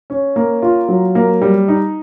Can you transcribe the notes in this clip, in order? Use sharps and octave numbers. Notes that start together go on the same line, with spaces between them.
C#4
A#3
F4
F#3
A#3
G3
D#4